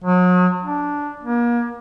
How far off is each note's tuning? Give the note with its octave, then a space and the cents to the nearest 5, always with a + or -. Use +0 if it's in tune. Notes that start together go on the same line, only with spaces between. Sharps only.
F#3 -40
D4 -5
A#3 +35